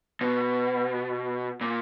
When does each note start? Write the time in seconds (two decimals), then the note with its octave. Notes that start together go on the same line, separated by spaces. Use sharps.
0.21 B2
1.61 A#2